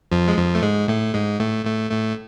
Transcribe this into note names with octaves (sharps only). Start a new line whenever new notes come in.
F2 F3
G#3
F2 F3
A3
G#2 G#3
A2 A3
G#2 G#3
A2 A3
A2 A3
A2 A3